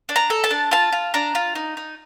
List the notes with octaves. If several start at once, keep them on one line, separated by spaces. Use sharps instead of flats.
D4
A#5
A4
A5
D4
F4 A5
F4
D4 A#5
F4
D#4
D#4